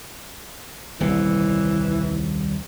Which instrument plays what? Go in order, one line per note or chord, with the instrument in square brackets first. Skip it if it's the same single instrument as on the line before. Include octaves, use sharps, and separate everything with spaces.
[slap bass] D#1 C2 C3 [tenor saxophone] E3